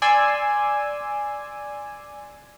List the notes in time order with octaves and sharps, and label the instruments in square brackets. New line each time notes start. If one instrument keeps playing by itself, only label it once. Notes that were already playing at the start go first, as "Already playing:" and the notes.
[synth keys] D5 G#5 C6 E6